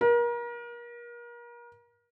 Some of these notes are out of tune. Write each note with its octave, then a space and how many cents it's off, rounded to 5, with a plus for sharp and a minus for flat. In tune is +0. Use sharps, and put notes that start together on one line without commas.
A#4 +35